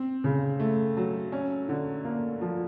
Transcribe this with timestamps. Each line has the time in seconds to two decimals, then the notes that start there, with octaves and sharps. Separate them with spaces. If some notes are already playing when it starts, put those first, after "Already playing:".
Already playing: C4
0.24 C#3
0.60 A3
0.97 F#3
1.32 C#4
1.69 D3
2.05 A#3
2.41 F3